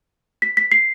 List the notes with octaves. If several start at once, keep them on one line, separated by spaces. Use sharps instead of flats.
B6
B6
C7